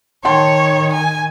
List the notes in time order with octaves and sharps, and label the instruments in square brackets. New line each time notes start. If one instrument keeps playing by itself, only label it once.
[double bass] D#3 [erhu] C#5 [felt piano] G5 A5 C6
[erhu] G#5